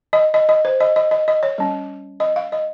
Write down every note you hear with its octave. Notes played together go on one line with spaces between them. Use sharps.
D#5
D#5
D#5
C5
D#5
D#5
D#5
D#5
C#5
G3 C#4
D#5
F5
D#5